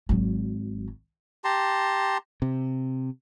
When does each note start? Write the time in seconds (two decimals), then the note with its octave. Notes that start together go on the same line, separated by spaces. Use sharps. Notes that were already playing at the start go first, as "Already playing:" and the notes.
0.09 G#1 F#3
1.44 G4 A5 A#5 C6
2.42 C3